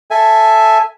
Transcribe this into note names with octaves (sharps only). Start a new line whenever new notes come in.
A4 E5 G#5